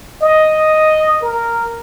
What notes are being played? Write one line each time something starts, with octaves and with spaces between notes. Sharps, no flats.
D#5
A#4